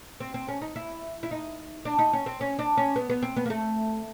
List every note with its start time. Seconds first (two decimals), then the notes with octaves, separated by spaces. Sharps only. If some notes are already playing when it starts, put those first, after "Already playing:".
0.20 C4
0.34 C4
0.48 C#4
0.62 D#4
0.76 E4
1.23 E4
1.31 D#4
1.85 D4
1.99 D#4
2.13 C#4
2.26 C4
2.41 C#4
2.59 D4
2.77 C#4
2.96 B3
3.09 B3
3.22 C4
3.36 B3
3.46 A#3
3.50 A3